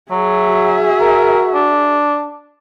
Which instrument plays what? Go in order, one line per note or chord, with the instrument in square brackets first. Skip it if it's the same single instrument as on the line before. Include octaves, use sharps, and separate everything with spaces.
[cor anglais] F#3 [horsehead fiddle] G#4 E5
[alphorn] F#4
[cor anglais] A#4
D4